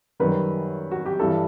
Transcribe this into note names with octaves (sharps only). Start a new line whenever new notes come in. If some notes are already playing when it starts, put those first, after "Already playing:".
F#2 D#3 G3 B4
F#4
G4
G2 E3 G3 A4